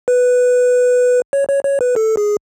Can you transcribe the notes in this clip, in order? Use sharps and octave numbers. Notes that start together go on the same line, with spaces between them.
B4
C#5
C#5
C#5
B4
A4
G#4